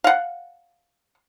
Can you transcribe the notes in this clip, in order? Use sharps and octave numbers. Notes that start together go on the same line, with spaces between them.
F5 F#5